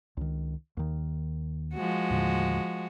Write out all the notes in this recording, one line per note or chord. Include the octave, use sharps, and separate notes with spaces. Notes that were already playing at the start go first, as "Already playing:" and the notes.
C#2 D#3
D#2 D#3
F3 G#3 F#4
D#2 A2 D3